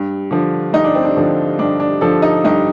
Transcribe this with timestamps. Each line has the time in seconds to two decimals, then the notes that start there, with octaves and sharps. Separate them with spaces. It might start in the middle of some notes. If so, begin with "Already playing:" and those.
Already playing: G2
0.31 D3 F3
0.73 G2 D#4
0.84 D4
0.95 C4
1.05 D4
1.16 D3 F3
1.59 G2 D4
1.80 D4
2.01 D3 F3 A4
2.22 D#4
2.44 G2 D#4